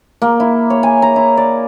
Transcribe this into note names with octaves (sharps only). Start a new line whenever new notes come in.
A#3
E4
C#5
G#5
A#5
E4
D5